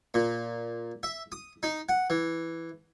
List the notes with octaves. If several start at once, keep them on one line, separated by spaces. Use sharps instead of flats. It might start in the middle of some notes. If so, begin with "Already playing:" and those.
A#2
E5
D#6
D#4
F#5
E3